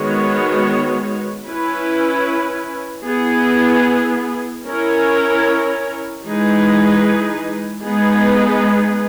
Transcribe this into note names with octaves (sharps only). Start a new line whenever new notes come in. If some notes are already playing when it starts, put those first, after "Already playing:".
Already playing: D#3 G#3 B3 F#4 C#5
C#4 E4 B4
B3 E4 G#4
C#4 E4 A#4 C#5
E3 G#3 D#4 G#4 B4
G#3 B3 D#4 G#4 B4